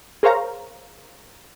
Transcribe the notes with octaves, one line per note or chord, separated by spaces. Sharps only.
G#4 A#4 C5 C#5 F5 A#5